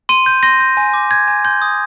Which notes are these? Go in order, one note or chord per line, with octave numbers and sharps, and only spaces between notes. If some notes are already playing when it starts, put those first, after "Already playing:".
C6 D#7
G6
C6 A#6
G6
G#5
D6
G6 G#6
G#5
C6 G6
D#6